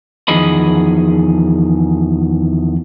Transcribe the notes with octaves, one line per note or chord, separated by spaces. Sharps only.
E2 D#3 F3 G#4 D#5 B5